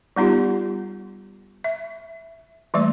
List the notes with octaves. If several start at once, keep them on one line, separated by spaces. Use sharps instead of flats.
G3 B3 D#4 F4 G4
E5
E3 G3 A3 A#3 D5